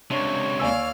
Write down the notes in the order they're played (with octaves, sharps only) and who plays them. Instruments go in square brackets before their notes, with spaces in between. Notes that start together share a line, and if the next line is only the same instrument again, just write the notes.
[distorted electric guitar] C#2 C3 [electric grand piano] D4 [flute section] C#5 C#6
[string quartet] D#2 F5 F6 [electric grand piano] D5 G#5 E6